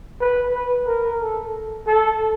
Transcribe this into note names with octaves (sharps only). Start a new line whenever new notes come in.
B4
B4
A#4
A4
A4